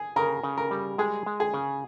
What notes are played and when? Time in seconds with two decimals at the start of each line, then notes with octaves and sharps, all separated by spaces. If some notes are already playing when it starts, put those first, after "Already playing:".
Already playing: G#4
0.16 C#3 A#4
0.43 C#3
0.57 A#4
0.71 G3
0.98 G#3 G#4
1.26 G#3
1.40 G#4
1.54 C#3